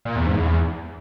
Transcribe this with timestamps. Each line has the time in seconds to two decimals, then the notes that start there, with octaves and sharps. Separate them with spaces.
0.05 A#2
0.16 E2
0.26 G#2
0.37 E2